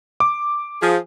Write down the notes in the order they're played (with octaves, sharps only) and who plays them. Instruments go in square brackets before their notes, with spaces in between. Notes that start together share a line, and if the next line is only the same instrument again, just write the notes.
[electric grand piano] D6
[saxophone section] F3 G#4